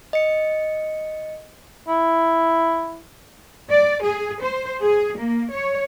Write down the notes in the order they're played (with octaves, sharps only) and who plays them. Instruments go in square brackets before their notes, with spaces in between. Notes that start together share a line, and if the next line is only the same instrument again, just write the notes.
[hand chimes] D#5 C#7
[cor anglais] E4
[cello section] D5
G#4
C5
G#4
A#3
C#5